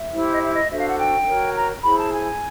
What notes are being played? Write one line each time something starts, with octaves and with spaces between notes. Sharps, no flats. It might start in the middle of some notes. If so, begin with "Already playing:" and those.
Already playing: E5
E4 G4 C5
D#5
E5
D#5
D4 F#4 A4 C5 E5
F5
F#5
G5
F#4 A#4 C#5
A#5
E4 G#4 C5 B5
A5
G#5